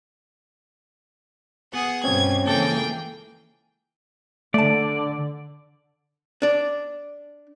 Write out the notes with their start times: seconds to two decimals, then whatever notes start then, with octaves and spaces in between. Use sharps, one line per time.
1.74 B3 G#4 F#5
2.04 G2 B2 C4 C#4 C#5 G#6
2.46 C#2 E3 A#3 G#4 A4 G5
4.54 D3 A3 D5 A5
6.42 D4 D5